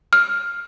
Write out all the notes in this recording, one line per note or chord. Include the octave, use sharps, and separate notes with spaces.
F6